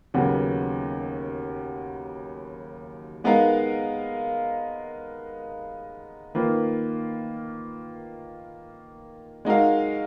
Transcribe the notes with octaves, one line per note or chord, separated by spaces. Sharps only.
D#2 C#3 F#3 B3 F#4
G#3 B3 D#4 A#4 F5
D#3 A#3 F4 B4
G#3 D#4 F#4 A#4 F5